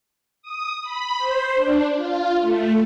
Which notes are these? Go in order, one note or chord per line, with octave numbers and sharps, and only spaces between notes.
D#6
B5
C5
D4
F4
A3